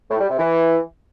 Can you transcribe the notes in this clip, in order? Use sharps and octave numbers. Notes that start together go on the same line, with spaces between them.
A2
G3
C3
E3